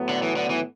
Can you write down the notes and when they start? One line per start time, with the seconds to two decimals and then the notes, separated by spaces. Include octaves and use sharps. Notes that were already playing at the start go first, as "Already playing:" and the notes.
Already playing: A2 F#3 B3
0.09 D3
0.23 E3
0.36 D3
0.50 E3